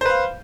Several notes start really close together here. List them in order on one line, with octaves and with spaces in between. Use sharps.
C5 B4 F5